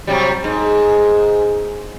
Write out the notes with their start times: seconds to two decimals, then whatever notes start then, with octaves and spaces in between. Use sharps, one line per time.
0.07 C3 F#3 G3
0.44 G#2